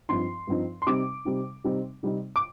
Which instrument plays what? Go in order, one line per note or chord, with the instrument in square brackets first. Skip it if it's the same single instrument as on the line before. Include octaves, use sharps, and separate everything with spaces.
[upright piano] G2 F3 C4 D#4 C6
G2 F3 C4 D#4
C6
C3 G3 C4 D#4 D6
C3 G3 C4 D#4
C3 G3 C4 D#4
C3 G3 C4 D#4
D6